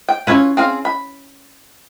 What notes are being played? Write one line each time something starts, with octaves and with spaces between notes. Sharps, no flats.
G5
C#4 E4 F4 B4 C#5
C4 G#4 F5
B5